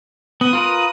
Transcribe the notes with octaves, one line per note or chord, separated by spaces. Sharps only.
B3 D#6
F4 A#4 B4